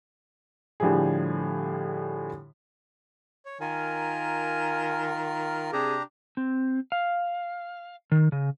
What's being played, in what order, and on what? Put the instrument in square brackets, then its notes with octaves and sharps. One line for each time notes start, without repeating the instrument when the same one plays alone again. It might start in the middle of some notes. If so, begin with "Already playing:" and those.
[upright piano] A2 D3 F3 G3 G4 G#4
[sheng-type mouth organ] C#5
[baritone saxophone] D#3 [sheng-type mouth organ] F4 A#4 [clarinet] G#5
[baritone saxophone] C3 [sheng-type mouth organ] D4 G4 A#5 [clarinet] G#4
[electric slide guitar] C4
F5
D#3
C#3